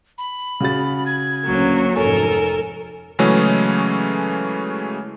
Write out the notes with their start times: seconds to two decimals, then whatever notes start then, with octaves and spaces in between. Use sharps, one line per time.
0.18 B5
0.60 C#3 F#4 A6
1.06 G#6
1.45 D2 F#3 A#3 C#4
1.95 F1 F2 G#2 A4 A#4 C#5 G#5
3.19 C#3 E3 F#3 G#3 A3 C#4